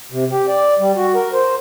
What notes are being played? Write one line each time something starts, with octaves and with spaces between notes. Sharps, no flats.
C3
G4
D5
G3
F#4
A#4
C5